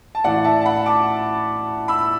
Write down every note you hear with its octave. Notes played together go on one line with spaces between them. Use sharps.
A5
A2 E3 D5 F#5
E5 A5
A5
F#5 B5
A5 D6
B5 E6